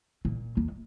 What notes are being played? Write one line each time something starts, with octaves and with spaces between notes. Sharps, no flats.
A#2
E2